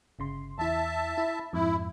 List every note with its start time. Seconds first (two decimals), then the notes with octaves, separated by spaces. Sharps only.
0.19 G1 C#3 C6
0.59 E2 E4 E5 A5
1.18 E4 B5
1.53 F2 G#2 E4